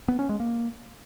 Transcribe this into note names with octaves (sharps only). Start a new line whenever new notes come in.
B3
C#4
G#3
A#3